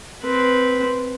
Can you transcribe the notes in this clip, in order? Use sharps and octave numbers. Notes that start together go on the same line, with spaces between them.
C4 B4